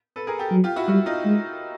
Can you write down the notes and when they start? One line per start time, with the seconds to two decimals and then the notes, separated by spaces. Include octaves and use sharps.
0.16 A4 B4
0.27 G#4 A#4
0.39 G4 A4
0.51 F#3
0.64 F4 G4
0.76 E4 F#4
0.88 G3 E4 F#4
1.06 D#4 F4
1.25 G#3